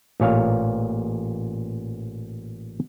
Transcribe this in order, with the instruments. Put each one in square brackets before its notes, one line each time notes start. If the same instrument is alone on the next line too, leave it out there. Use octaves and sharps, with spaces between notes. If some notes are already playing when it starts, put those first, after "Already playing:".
[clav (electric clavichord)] A1 A#2 C#5 F5